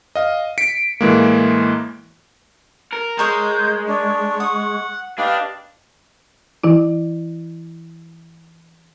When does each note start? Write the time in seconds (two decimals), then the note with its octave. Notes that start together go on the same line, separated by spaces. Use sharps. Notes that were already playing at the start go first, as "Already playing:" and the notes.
0.15 D#5 F5
0.58 B6 C#7 D7
1.01 A2 E3 G#3 A#3
2.93 A#4
3.19 G#3 A#4 C#5 D#5 G6
3.88 D4 C#6
4.40 F#5 D#6
5.18 D4 G4 B4 D#5 F5
6.64 E3 E4